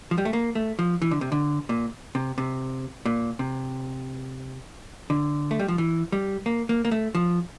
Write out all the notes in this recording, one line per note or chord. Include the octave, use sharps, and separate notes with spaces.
F3
G3
A3
A#3
A3
F3
E3
D3
C3
D3
A#2
C3
C3
A#2
C3
D3
A3
G3
F3
E3
G3
A#3
A#3
A#3
A3
F3